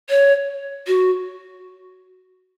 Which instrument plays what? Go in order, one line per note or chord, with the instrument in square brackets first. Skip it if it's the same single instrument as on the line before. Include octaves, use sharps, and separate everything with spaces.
[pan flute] C#5
F#4